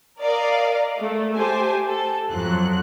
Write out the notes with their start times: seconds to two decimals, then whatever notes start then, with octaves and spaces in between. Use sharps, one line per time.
0.19 A#4 D5 D#5 F5
1.00 A3
1.34 G4 C5 G#5 A5
1.88 A4
2.31 F2 F3 F#3 F#6